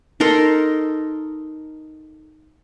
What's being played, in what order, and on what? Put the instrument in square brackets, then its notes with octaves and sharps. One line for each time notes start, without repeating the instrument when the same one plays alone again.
[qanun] D#4 A4 A#4 C6